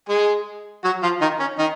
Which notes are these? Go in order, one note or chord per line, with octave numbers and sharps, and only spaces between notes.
G#3 G#4
F#3 F#4
F3 F4
D#3 D#4
C#4
D#3 D#4